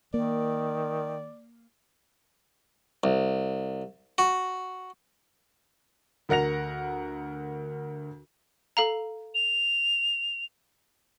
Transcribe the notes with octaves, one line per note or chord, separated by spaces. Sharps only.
D#3 A#3 D5
C2
F#4
D2 A#4 F#5 A#6 F7
A4 F5 A#5
F7